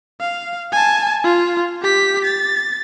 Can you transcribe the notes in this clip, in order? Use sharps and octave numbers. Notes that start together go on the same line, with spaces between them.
F5
G#5 A5
F4
G4 B6
A6